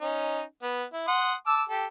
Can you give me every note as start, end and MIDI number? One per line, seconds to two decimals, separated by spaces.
0.01 0.42 61
0.01 0.42 63
0.63 0.84 59
0.93 1.05 64
1.08 1.34 78
1.08 1.34 84
1.08 1.34 87
1.47 1.62 81
1.47 1.62 86
1.47 1.62 88
1.69 1.86 67
1.69 1.86 69